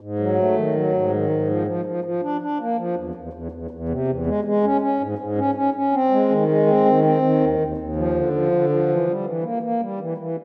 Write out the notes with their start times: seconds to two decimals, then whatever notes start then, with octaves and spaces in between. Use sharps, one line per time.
0.01 G#2
0.19 F#3
0.38 A3
0.56 D#3
0.75 F#3
0.93 G#2
1.11 D#3
1.30 G#2
1.49 F3
1.67 F3
1.85 F3
2.04 F3
2.22 D4
2.41 D4
2.60 A#3
2.78 F3
2.96 E2
3.15 E2
3.33 E2
3.52 E2
3.71 E2
3.89 C3
4.08 E2
4.26 G#3
4.44 G#3
4.63 C#4
4.81 C#4
5.00 G#2
5.18 G#2
5.37 C#4
5.55 C#4
5.74 C#4
5.92 C4
6.11 G#3
6.29 D#3
6.48 G#3
6.66 C4
6.85 D#3
7.04 C4
7.22 D#3
7.40 D#2
7.60 D#2
7.78 D#2
7.96 F3
8.14 D3
8.33 F3
8.52 D3
8.70 F3
8.88 E3
9.07 G3
9.25 E3
9.44 A#3
9.63 A#3
9.81 G3
10.00 E3
10.18 E3